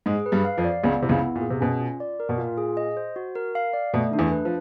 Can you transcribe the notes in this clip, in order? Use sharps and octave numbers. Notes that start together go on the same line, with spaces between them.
G#2 G#3 G#4
B4
G2 G3
F5
F2 F3
D5
C#2 C#3 B3
C3 E4
C#2 C#3
B3
A#2
G#4
C3
B2 C#4
F4
D5
A#4
B2
A#2 F4
G#4
D#5
C5
F#4
A#4
F5
D5
B2 A3
D#3 D4
E2 E3
B4
F3